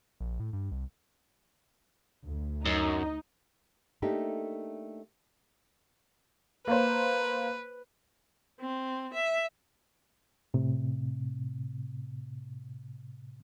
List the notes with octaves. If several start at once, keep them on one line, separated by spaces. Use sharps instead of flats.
A#1
A2
G2
C2
D2
F#2 D#4
A3 A#3 D4 D#4 G4
A#3 B4 C5
C4
E5
A2 C3